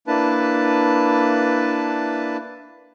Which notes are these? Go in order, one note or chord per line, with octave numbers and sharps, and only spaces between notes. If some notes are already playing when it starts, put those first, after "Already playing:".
A#3 D4 E4 B4 A5